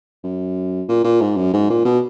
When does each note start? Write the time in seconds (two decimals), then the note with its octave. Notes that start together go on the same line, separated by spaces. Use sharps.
0.24 F#2
0.88 A#2
1.04 A#2
1.21 G#2
1.36 F#2
1.53 G#2
1.70 A#2
1.85 B2